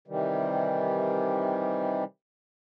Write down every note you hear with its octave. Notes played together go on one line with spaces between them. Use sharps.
C3 D#3 E3 G3